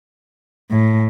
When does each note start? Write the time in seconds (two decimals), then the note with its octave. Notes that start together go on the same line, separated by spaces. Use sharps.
0.71 A2